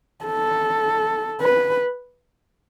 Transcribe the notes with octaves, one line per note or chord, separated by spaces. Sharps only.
A4
B4